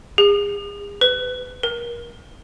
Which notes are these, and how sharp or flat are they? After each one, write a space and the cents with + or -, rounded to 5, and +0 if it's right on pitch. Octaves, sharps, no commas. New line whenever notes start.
G#4 -35
B4 +25
A#4 +30